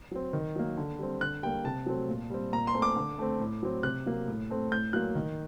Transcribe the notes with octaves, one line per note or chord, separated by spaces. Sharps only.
F#3 C4
D#3
F#3 A#3
D3
G3 C4
D3 F#6
G3 A#3 G5
C3 A5
F#3 A3 C4
A#2
G3 C4
A#2 A#5
C6
A3 C4
D6
D3
A3 C4
A2
F#3 C4
C3 F#6
F#3 A#3
A2
A3 C4
A2 G6
F#3 A#3 F#6
D#3